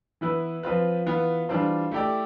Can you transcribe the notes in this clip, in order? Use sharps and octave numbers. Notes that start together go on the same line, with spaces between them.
E3 B3 E4 B4
F3 C4 F4 B4
E3 B3 F4
E3 G3 D4 F4 C5
A3 E4 G4 D5